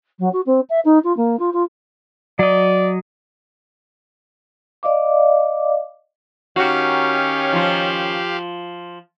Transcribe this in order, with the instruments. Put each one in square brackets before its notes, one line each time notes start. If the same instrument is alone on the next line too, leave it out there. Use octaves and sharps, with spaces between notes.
[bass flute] F#3
F#4
C4
E5
D#4
F4
A#3
F4
F4
[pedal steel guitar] F#3 D#5 [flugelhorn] D5
[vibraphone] D5 D#5 F5 D6
[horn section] D#3 C#4 [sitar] F#4 [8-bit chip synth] G4 F5
[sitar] F3 F4